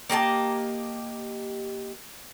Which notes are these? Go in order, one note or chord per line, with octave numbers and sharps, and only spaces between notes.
A#3 G4 D#5 A5